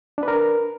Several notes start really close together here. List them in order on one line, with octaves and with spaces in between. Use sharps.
D4 B4 A#4